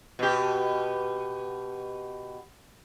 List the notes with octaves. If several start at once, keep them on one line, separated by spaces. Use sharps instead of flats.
B2 G4